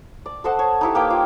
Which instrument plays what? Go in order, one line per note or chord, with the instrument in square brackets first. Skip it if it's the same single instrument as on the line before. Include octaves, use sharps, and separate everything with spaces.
[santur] D5
A4 C5 D#5 F#5
C#5
D#4 E4 G4
A#3 G4 B4 G5
F4